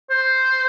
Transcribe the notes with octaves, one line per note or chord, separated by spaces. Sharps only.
C5